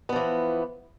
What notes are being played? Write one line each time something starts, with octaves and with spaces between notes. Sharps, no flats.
E3 F3 B3